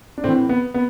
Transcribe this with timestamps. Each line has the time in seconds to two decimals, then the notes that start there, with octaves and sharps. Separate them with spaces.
0.18 D4
0.24 A2 E3 A3 C4
0.49 B3
0.74 B3